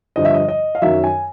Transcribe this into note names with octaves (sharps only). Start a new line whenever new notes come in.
G2 D3 F3 D#5
E5
D#5
D#5
F5
F#2 D#3 F#3 E5
G#5